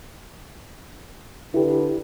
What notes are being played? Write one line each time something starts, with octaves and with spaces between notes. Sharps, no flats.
D3 E4 G4 A4 B4